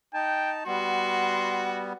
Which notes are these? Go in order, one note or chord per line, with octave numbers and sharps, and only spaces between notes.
D#4 G5 A5
G3 B3 F#4 C6